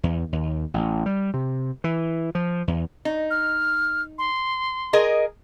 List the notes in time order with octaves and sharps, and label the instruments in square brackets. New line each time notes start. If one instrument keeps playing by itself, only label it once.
[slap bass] E2
D#2
A1
G3
C3
E3
F3
E2
[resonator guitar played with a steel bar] D#4
[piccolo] F6
C6
[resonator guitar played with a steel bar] G#4 A#4 D#5